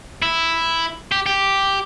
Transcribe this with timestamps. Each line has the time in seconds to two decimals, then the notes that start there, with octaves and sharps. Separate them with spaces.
0.22 E4
1.12 G4
1.26 G4